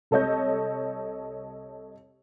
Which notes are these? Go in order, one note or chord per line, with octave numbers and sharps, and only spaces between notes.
C2 A4 C#5 D#5 G6